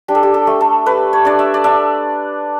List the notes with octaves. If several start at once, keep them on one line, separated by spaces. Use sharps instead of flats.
D4 G4
A4
G4
A4
A3
A4
A3 B4
C#5
D4 D5
E5
D5
D4 E5